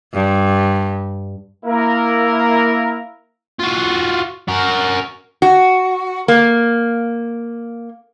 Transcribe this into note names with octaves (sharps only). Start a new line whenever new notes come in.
G2
A#3 E4 A#4
F4 F#4
F#4 A#4
F#4
A#3